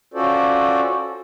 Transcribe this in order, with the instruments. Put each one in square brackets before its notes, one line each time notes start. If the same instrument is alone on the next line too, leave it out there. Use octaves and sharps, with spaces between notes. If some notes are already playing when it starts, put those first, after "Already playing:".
[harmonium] C#4 F4 F#4 A4 C5 D5